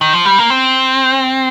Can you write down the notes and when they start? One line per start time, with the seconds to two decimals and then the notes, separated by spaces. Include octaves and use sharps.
0.01 D#3
0.13 F3
0.25 G3
0.38 A#3
0.50 C4